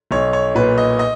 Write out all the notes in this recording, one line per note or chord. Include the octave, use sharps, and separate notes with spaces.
B1 C#5
C#5
A#2 B4
D#5
D#5